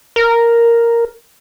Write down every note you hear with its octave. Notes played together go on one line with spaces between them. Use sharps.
A#4